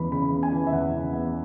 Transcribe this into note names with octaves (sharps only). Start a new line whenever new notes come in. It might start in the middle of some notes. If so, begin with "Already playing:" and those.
Already playing: E2 C#3 E3 B3 B5
C#3 B5
B3
G#5
E3
E5
E2 F#5
C#3
B3